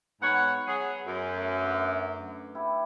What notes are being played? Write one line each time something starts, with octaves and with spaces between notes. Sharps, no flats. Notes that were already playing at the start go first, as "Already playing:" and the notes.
G#2 B3 C#5 F#5
F#3 G#4
F#2
A3
D3 D6
E4 G4